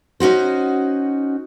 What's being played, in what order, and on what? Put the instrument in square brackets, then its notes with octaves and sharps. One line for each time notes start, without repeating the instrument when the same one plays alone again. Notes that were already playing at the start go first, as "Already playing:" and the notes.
[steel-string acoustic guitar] C#4 D#4 F#4 C5